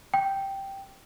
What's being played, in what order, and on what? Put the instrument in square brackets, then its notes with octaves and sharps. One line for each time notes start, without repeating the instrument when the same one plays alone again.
[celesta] G5